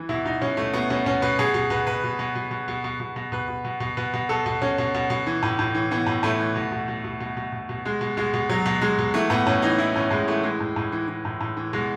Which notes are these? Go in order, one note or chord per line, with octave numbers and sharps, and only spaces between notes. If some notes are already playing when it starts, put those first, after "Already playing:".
Already playing: E3
B2 E4
B2 D#4
B2 C#4
B2 A3
B2 B3
B2 C#4
B2 C#4
B2 B4
B2 G#4
B2
B2 B4
B2 B4
B2
B2
B2
B2
B2
B2
B2
B2
B2 B4
B2
B2
B2
B2 B4
B2
B2 A4
B2
B2 C#4
B2
B2
B2
E3
A2
A2
E3
E3 B3
A2
A2 A3
E3
B2
B2
B2
B2
B2
B2
B2
B2
B2 G#3
B2
B2 G#3
B2
B2 F#3
B2
B2 G#3
B2
E3 A3
A2 B3
A2 C#4
E3 D#4
E3 E4
A2 C#4
A2 G#3
E3 A3
E3 G#3
A2
A2
E3
E3
A2
A2
E3
B2 G#3